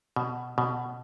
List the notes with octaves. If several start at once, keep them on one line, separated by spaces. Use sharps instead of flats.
B2
B2